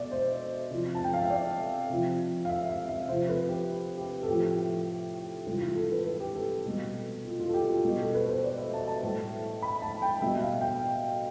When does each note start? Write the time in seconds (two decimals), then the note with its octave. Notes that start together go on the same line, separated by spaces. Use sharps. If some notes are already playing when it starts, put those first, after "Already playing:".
Already playing: B2 D5 E5
0.11 C5
0.71 C3 F3
0.95 A5
1.04 G5
1.14 F5
1.22 E5
1.30 D5
1.90 C3 F3
2.45 F5
2.50 E5
2.69 F5
2.89 E5
3.09 C3 F3 C5
3.29 B4
3.49 G4
3.98 G4
4.23 A4
4.28 A2 F3 G4
5.47 C3 E3 G3 F4
5.61 F4
5.76 A4
5.92 B4
6.06 B4
6.20 G4
6.35 A4
6.66 B2 G3
7.25 F4
7.40 F4
7.49 A4
7.54 G4
7.69 F4
7.84 B2 G3 G4
7.99 A4
8.14 B4
8.29 C5
8.44 D5
8.58 E5
8.74 A5
8.87 A5
9.03 A2 G3
9.62 B5
9.82 A5
10.02 G5
10.22 B2 G3 E5
10.42 F5
10.61 G5